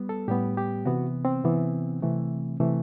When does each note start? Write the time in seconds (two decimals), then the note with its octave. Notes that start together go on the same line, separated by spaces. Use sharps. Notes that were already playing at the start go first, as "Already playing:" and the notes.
Already playing: G3 B3
0.09 A4
0.28 A2 G3 B3 G4
0.57 G4
0.85 C3 E3 B3 F#4
1.25 C4
1.44 C3 E3 B3
2.02 C3 E3 A3
2.60 C3 E3 A3